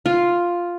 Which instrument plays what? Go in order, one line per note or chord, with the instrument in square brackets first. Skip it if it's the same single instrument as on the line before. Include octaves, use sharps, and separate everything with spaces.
[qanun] F4